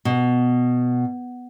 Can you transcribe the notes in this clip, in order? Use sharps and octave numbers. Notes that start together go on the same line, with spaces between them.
B2